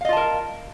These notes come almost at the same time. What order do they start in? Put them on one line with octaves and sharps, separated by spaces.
F5 D#5 F4 A5 A#4